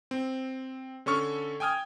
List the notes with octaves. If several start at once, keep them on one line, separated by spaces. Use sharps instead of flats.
C4
D3 C#4 A4 C#6 F6
G5 G#5 D#6 F6 G#6